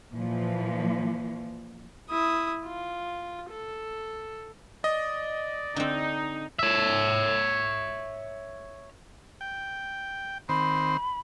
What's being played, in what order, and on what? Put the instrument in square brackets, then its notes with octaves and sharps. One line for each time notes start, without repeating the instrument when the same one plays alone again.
[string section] A#2 E3 F3
[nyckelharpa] E4 D#6
F4
A4
[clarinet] D5 [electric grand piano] D#5
[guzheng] D3 C4 [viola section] D#4
[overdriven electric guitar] C#5 E5
[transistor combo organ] G5
[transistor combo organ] D#3 C4 C5 [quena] B5